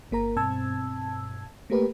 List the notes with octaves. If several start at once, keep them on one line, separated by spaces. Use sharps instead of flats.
G1 A#3 A#4 A#5
G2 B2 C4 A5 E6 G#6
A3 A#3 G4 A#4 B4